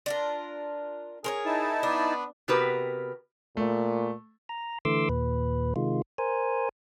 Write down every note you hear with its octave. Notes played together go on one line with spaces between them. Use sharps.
D4 F4 A#4
G#4 A#4 C5 C#5
D#4 E4 A5
B3 D4
C3 B3 F#4 G4 A#4 B4
A#2 A3
A#5
D3 E3 A3 C6 D6 E6
D#2 A#2 B4
C3 D#3 G#3 F4
A#4 C5 G#5